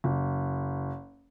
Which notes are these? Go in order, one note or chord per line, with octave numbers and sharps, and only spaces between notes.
F#1